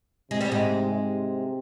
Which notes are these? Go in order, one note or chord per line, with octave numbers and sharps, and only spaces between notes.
C3 G#3
G3
G#2 G#3
C3